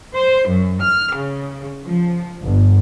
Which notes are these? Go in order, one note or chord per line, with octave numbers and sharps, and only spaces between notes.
C5
F#2
F6
C#3
F3
G1